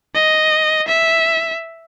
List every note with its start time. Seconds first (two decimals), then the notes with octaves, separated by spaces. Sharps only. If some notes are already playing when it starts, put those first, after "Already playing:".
0.15 D#5
0.87 E5